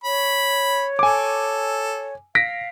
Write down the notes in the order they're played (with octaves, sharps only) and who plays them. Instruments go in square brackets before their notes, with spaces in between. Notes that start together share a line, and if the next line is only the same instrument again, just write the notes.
[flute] C#5 [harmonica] B5
[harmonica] A4 [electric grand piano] G#5 D6
[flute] F5 [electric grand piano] A#6 B6 D7